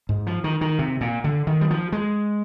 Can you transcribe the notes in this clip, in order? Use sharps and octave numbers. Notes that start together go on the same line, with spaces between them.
G#2
F3
D#3
D#3
C3
A#2
D3
D#3
G3
F3
G#3